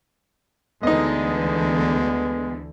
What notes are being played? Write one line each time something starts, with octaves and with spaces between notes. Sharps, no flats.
D2 D3 E3 G#3 B3 D#4 D#5